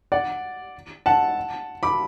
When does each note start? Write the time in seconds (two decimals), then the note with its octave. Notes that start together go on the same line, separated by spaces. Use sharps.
0.12 D5 F#5
1.06 F#5 A5
1.83 B5 D6